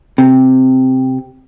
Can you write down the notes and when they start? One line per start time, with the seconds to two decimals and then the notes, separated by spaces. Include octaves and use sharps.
0.18 C3